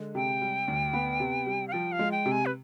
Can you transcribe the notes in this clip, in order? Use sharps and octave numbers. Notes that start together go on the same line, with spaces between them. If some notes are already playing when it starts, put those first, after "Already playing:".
Already playing: D3 G#3
C3 G5
G3
D2
B3
C3
G3
F5
F3 G5
F5
G#3
G5
C3
G#5
B4